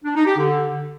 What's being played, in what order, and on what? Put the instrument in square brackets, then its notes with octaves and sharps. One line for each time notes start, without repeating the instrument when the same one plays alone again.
[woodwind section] D4
D#4
G4
D3